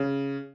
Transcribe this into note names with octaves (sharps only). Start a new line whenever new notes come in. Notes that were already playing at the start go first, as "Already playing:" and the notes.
Already playing: C#3